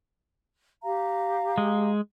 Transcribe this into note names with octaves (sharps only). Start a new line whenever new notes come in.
G4 F5 A#5
G#3